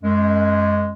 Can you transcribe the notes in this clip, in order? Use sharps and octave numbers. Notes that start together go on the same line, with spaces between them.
F#2 G#3